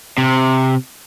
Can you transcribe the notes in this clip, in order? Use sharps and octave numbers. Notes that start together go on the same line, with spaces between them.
C3